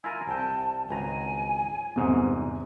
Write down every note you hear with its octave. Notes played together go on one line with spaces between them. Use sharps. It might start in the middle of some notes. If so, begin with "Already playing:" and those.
E4 F4 A#4 G#5
C2 G5 A5
G#1 C#2 G#5 A#5
G1 E2 G#2 C3